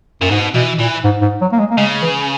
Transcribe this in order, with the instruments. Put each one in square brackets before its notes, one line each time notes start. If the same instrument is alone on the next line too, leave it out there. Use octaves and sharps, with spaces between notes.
[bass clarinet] F#2 [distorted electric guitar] A#2
[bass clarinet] G#2 [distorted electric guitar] B2
[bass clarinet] B2 [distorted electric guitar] E3
[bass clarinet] A#2 [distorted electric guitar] E3
[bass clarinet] G#2
G#2
F#3
A#3
G#3
A#3
[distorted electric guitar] C#3 [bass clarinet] G#3
[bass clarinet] E3